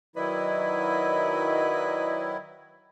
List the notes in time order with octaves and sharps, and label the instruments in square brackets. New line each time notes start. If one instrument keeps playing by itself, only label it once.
[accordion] D#3 F#3 E4 [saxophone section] B4 D5 D#5